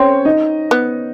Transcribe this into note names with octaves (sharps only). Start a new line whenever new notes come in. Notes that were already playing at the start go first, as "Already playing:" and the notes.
Already playing: C4 C#4 C5 C#5
D#4 D#5
B3